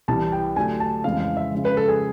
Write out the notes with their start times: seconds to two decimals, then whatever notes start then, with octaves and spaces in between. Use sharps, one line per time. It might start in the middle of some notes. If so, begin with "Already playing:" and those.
0.08 C2 C3 E3 G3 A5
0.32 G5
0.56 D3 F#3 A3 D4 G4 G#5
0.80 A5
1.04 F2 C#3 E3 G#3 F5
1.20 F5
1.37 E5
1.52 C#3 F3 G#3
1.65 B4
1.77 A4
1.88 G#4